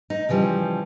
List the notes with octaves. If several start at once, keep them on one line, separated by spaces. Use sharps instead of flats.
D#4
C#3 E3 F3 G3